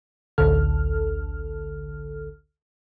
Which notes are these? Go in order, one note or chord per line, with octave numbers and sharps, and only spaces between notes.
A1 D2 D3 A4 F6